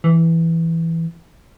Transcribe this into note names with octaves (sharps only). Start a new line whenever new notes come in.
E3